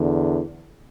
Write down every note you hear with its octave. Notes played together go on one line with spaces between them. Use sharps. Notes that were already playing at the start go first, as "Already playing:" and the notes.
Already playing: E2 D3